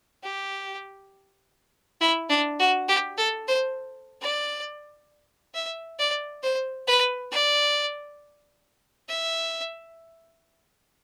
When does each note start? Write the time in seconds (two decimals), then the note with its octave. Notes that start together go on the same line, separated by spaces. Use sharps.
0.23 G4
2.00 E4
2.29 D4
2.59 F#4
2.88 G4
3.17 A4
3.48 C5
4.21 D5
5.54 E5
5.99 D5
6.43 C5
6.87 B4
7.31 D5
9.08 E5